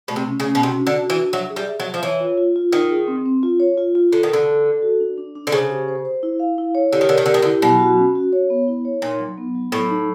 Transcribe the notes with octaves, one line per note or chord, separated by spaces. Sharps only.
B2 A3
C3
C#4
C#3
C#4
B2
C3 F#4
D4
D3
F#4
E3
D4
F#3 E5
G#4
G3
E5
F#3
E5
F3
E3 C#5
F4
F4
F4
D#3 D#4
G#4
C4
C4
F4
C#5
F4
F4
D3 A4
D#3
D3 A4
A4
A4
F#4
D4
D4
D4
D3
C#3 C5
G4
C5
C5
E4
F5
E4
C#5
D3 G4
D#3
D3 A#4
D#3
D3 G4
D#3
D3
E4
B2 F#3
F#4
C#4
F#4
C#5
B3
E4
C#5
A#2 D#4
F#3
B3
F#3
A2 F#3
D#4